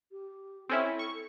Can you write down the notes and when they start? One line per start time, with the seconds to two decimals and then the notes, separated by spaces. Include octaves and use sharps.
0.12 G4
0.69 C4 C#4 E4 A4
0.99 C#6